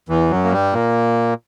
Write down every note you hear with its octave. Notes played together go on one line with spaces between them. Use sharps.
E2 E3
F#2 F#3
A#3
G2 G3
A#2 A#3